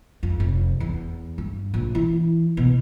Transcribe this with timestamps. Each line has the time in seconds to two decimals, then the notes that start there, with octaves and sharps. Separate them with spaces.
0.23 F2
0.40 F1
0.80 E2
1.38 G2
1.74 A#1
1.95 E3
2.57 B2